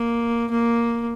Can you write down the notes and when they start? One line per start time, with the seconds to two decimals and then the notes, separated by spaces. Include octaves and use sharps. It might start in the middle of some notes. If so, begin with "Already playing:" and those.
Already playing: A#3
0.51 A#3